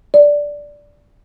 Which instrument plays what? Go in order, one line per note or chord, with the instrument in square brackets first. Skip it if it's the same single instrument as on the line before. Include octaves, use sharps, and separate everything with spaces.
[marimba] D5